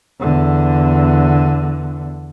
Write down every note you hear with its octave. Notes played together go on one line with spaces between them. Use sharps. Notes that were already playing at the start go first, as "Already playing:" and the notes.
E2 D3